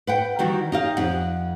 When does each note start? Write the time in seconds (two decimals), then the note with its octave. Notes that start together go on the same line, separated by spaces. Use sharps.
0.07 B4 F#5 G5
0.39 D#3 E3 G3 F#4
0.72 D#4 G4 F5
0.97 F2 F#5